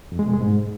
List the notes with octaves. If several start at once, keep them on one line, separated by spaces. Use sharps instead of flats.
F2
G#3
B2
G#3
G#2